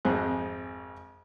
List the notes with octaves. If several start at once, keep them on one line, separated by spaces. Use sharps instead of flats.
G#1 F2 G#3 G#4 C5 F#6